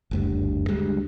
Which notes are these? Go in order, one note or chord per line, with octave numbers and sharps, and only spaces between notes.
F#1 D2 G2
D2 G3 G#3